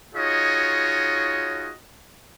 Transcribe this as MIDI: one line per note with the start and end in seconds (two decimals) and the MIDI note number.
0.15 1.71 63
0.15 1.71 65
0.15 1.71 66
0.15 1.71 68
0.15 1.71 73
0.15 1.71 75